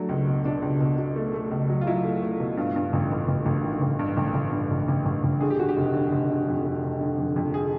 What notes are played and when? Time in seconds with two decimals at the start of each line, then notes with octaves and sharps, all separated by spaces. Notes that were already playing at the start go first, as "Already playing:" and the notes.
Already playing: F#3 A3 D4
0.09 C#2
0.27 B2
0.44 B2 D4
0.62 C#2
0.80 B2
0.98 B2
1.16 A3
1.34 A3
1.51 C#2
1.70 F#3
1.81 F4
1.87 F#3 E4
2.04 A3
2.22 A3
2.40 B2
2.57 G2 F4
2.76 G2
2.93 A1
3.11 A1
3.28 A1
3.46 A1
3.64 D#3
3.81 A1
3.99 G2
4.17 A1
4.34 A1
4.52 G2
4.71 A1
4.88 A1
5.06 A1
5.23 A1
5.41 D3 G#4
5.50 G4
5.59 D3 F#4
5.68 G4
5.77 F1
5.94 D3
6.12 F1
6.30 D3
6.48 F2
6.65 F1
6.83 F1
7.01 D3
7.18 F2
7.36 F2
7.54 G#4